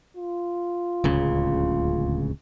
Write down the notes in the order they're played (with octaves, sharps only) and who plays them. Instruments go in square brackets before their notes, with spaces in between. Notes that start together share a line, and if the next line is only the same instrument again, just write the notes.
[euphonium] F4
[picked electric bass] D1 C#2 C#3